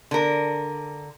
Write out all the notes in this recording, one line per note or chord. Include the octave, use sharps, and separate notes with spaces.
D3 A#4